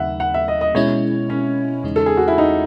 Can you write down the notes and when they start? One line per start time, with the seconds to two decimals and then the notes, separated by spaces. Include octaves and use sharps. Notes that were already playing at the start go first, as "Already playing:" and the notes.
Already playing: D#2 C#3 F#3 A3 D#4 E5 F#5
0.20 F#5
0.34 E5
0.48 D#5
0.61 D#5
0.75 B2 G#3 C#4 E4 C#5
1.30 C#4
1.83 E2 C#3 G#3 D#4
1.96 A4
2.06 G#4
2.17 F#4
2.28 E4
2.38 D#4